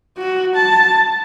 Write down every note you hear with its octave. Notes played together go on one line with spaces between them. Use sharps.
F#4
A5